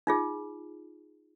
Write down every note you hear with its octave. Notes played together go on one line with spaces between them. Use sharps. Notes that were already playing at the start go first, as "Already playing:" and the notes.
D#4 F4 G#4